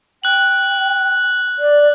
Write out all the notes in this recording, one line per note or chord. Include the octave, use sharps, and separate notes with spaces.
G5 F#6 F#7
D5